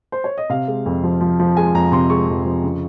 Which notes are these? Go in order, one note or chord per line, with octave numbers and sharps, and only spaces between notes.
C5
C#5
D#5
C3 F5
G#3
F2
F3
F3
F3
G#3 G#5
F2 A#5
C3 C6
G#3 C#6
F2
F3
C#3